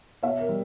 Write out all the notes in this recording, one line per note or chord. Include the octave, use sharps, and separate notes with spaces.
B2 C#5 E5
A#4
G3